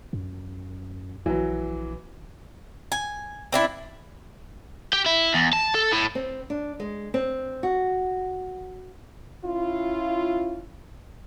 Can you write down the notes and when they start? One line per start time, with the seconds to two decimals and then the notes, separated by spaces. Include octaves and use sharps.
0.13 F#2
1.26 A#1 E3 F#3
2.92 G#5
3.52 C4 D4 E4
4.93 G4
5.06 E4
5.34 E2
5.53 A5
5.75 A4
5.92 A2
6.15 C4
6.50 D4
6.80 G#3
7.14 C4
7.63 F#4
9.44 C#4 E4 F4